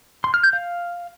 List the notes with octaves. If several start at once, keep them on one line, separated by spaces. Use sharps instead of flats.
C6
F6
G6
F5